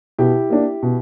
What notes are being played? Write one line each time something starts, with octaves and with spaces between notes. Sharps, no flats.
B2 E4 G4
A#3 D4
B2